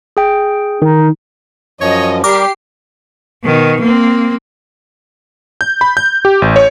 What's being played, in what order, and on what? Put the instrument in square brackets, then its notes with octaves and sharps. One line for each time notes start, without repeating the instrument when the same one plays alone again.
[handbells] G#4 G5
[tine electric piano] D#3 [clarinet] D#4
[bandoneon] F#2 F3 [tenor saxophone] C#5 [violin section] D#5
[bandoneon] G3 [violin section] G4 C7 [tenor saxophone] A#4 [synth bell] D6
[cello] B2 D#3
A#3 C4
[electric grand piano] G6
B5
G6
G4
A1
C#5